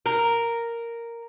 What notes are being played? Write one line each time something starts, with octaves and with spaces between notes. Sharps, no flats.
A#4